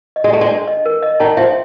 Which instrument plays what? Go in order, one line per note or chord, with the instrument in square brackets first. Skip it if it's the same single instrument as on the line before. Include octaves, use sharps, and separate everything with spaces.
[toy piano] D#5
[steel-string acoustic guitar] G#3
[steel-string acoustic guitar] A3 [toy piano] G5
[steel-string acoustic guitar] G#3
[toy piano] D4
D#5
A#4
D#5
[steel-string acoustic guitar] D#3 [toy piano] A5
[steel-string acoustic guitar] F3 [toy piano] E5